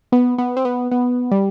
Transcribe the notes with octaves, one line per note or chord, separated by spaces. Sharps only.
B3
B3
C4
B3
B3
G3